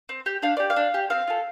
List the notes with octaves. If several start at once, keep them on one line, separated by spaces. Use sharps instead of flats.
C4
G4
D4 F5
G4 D5
F5
D4
G4
C4 F5
F4 A4